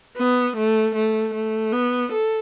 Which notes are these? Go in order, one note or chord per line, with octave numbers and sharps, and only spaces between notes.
B3
A3
A3
A3
B3
A4